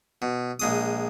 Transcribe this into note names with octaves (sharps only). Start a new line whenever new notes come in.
B2
A#1 G#3 D#6